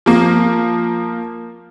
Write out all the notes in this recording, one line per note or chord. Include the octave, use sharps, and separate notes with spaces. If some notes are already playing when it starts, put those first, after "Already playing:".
F3 A#3